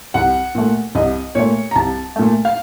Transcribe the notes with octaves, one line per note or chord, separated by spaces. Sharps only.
C2 F#5
A#2 A3
C2 D#5
A#2 A3 C#5
A#5
C2 A5
A#2 A3
F5